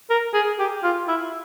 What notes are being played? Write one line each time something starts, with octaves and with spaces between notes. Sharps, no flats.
A#4
G#4
G4
F4
E4